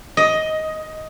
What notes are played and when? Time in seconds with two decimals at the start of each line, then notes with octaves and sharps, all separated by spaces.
0.17 D#5